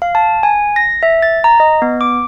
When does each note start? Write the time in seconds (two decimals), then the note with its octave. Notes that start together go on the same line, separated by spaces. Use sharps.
0.02 F5
0.15 A5
0.43 G#5
0.76 A#6
1.03 E5
1.22 A6
1.44 A#5
1.60 D#5
1.82 B3
2.01 D6